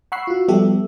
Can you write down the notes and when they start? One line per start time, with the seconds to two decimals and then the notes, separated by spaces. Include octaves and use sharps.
0.12 F#5 B5 C#6 E6 F#6 C7
0.27 F4 F#4
0.48 F3 G3 B3 G4 A4 E5